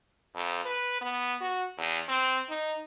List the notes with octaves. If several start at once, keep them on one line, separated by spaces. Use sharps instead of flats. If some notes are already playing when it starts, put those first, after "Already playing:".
F2
B4
B3
F#4
E2
C4
D#4